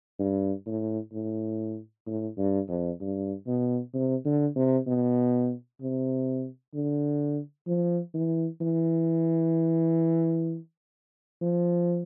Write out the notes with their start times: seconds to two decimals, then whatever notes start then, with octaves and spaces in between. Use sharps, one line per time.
0.19 G2
0.66 A2
1.13 A2
2.07 A2
2.38 G2
2.69 F2
3.01 G2
3.47 B2
3.94 C3
4.25 D3
4.56 C3
4.87 B2
5.81 C3
6.74 D3
7.67 F3
8.14 E3
8.61 E3
11.41 F3